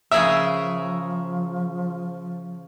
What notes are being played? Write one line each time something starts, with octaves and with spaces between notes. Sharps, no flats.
C#3 F3 G#4 A#4 E5